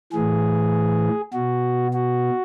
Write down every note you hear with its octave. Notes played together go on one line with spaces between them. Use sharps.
A2 E3 G#4
B2 F#4
F#4